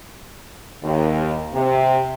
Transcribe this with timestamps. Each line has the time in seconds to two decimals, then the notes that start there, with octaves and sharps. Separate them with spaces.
0.83 D#2
1.54 C3